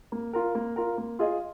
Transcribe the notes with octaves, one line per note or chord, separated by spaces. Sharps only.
A#3
F4 A#4
A#3
F4 A#4
A#3
F4 G#4 D#5